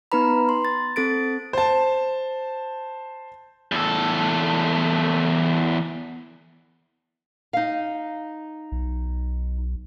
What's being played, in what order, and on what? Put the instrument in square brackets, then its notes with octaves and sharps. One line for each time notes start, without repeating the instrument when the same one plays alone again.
[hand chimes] B3 D#4 B4 A#5 B5
C6
A6
C4 A4 A6 D7
[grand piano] C5 A5
[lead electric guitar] E2 A4
[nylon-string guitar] D#4 F5
[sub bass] B1